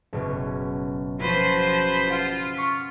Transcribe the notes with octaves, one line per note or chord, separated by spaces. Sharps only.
F#1 B2 C#4
F3 C#4 F#4 B4 C5
F4 F5 F#5
C#6 F6 B6